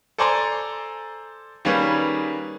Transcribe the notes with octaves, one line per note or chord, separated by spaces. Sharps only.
A4 C5 D5 G#5 A#5 C6
D#3 G3 A#3 C#4 G#4 B4